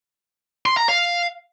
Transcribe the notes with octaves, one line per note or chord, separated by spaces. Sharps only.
C6
A#5
F5